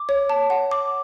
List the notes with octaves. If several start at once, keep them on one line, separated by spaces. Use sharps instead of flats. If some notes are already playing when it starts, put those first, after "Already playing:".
Already playing: D6
C#5
A5
F#5
D6